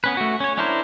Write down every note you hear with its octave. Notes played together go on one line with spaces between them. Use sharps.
B3 C#4 B4
A3 F#4
C#4 C#5
C#4 D4 E4 A#4 C5